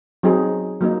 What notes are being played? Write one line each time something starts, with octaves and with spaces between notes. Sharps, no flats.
F#3 C4 D#4 G#4
F#3 A#3 D#4